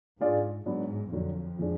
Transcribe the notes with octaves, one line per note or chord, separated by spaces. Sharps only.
G#2 G#3 D4 F4 G#4 D5
G#2 F#3 B3 D4
F2 D3 F#3 D4
F3 G#3 D4